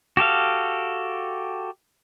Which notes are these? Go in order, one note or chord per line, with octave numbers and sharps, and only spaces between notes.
F#4 G4 A4 F5